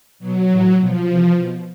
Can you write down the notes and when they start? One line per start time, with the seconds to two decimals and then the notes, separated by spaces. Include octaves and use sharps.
0.19 B2 F#3
0.49 A2 E3
0.78 B2 F3
1.08 C3 E3
1.37 B2